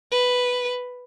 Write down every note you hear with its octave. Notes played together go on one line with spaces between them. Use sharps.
B4